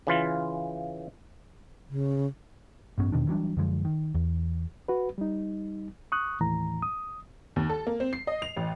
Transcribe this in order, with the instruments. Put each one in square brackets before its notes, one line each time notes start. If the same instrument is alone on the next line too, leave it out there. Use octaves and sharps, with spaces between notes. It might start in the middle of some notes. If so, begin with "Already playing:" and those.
[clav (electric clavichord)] C#3 E3 F4
[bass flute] C#3
[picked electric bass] A1 G2 B3 C#4
E2 B2 D#3 D4
E3 F#3 G3 D4
F#2 D3 F3 G#3
D#3
E2
[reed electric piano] F#4 B4
G3 D#4
C#6 D#6 F#6
D#2 A2 E3 A#5
D#6
[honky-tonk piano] D#2
A4
A#3
C4
C7
D#5
F7
A1